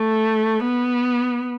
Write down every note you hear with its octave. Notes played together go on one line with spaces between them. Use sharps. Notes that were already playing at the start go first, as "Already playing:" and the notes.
Already playing: A3
B3